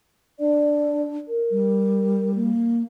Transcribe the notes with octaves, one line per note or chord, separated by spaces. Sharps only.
D4 D5
A#4
G3
A#3